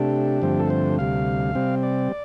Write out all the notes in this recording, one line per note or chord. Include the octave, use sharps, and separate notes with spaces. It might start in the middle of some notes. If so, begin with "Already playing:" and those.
Already playing: C3 A3 D4 G4
G2 D3 F3 A3 C4
A4
C5
D2 C3 G3 F5
C3 G3 C4
D5